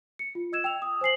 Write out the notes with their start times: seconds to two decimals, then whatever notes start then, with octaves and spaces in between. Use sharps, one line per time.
0.19 C#7
0.35 F4
0.52 D#5 E6 G#6 E7
0.64 G5 E6 F7
0.82 D#6
1.01 C5 G#5 C7 F#7